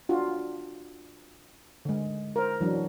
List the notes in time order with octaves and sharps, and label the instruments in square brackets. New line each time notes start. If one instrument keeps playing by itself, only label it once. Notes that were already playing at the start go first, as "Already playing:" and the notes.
[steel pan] D4 F4 F#4
D3 G#3
A#4 C5
E3 F#3 D4